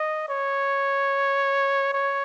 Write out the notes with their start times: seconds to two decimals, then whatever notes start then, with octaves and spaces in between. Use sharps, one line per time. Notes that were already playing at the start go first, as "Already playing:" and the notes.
Already playing: D#5
0.29 C#5
1.93 C#5